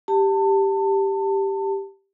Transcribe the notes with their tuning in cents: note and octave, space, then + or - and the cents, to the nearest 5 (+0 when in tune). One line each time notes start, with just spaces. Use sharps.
G4 +0 A5 +25